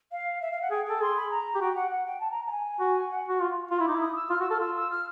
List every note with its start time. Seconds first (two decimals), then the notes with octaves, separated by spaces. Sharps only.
0.11 F5
0.41 E5
0.51 F5
0.61 F#5
0.71 G#4 G5
0.85 A4 G5
1.01 G#4 C6
1.16 B5
1.31 A#5
1.55 G4
1.61 F#4 G5
1.76 F#5
1.91 F#5
2.06 G5
2.20 A5
2.30 A#5
2.47 A5
2.50 G#5
2.80 F#4
3.10 F#5
3.29 F#4
3.40 F4
3.71 F4
3.80 E4
3.85 D#4 D6
3.96 E4 D#6
4.15 E6
4.30 F4 F6
4.40 F#4 E6
4.50 A4 F6
4.60 F4 E6
4.75 E6
4.90 F6